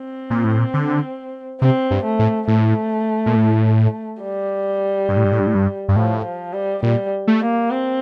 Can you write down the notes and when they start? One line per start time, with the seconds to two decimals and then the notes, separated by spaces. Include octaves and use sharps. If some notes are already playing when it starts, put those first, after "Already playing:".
Already playing: C4
0.30 A#2
0.44 A2
0.59 A#2
0.74 D3
1.61 C3 C4
1.91 G2
2.04 A3
2.19 A2
2.48 A2 A3
3.26 A#2
3.35 A2
4.23 G3
5.09 G2
5.17 A2
5.24 G2
5.32 A2
5.40 G2
5.47 A2
5.55 G2
5.88 G2
5.96 A2 F3
6.25 F3
6.54 G3
6.83 A#2 G3
7.27 A3
7.41 A#3
7.71 C4